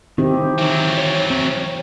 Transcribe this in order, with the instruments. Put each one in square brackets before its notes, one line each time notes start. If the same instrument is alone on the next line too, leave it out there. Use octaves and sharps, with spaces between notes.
[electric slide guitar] D#3 [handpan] C4 E4 G4
[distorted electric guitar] E3 F#3
[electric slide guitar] C#5
[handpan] C4